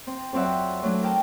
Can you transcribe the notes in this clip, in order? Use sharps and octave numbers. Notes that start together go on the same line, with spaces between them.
C4
F2 F#3 C4 D5 E5 F#5
F#3 A3 D4
E4 A#4 G5 A5